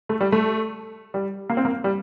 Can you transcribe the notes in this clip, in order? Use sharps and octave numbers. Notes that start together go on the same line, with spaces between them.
A3
G3
A3
G3
A#3
C4
A#3
G3